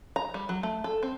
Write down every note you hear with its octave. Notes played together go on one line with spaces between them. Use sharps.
A#5
G3
F#3
A3
A4
C4